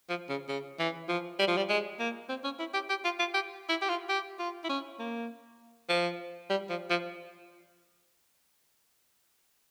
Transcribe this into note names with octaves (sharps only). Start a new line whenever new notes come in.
F3
C#3
C#3
E3
F3
G3
F3
G3
G#3
A#3
C4
C#4
E4
G4
G4
F4
F4
G4
E4
G4
F4
G4
F4
E4
C#4
A#3
F3
G3
F3
F3